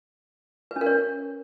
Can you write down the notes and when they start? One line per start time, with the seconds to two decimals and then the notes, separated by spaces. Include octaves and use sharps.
0.71 B4
0.76 C#4
0.81 A#4
0.86 C#5